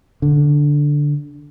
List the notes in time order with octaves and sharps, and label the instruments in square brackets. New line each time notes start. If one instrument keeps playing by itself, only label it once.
[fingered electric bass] D3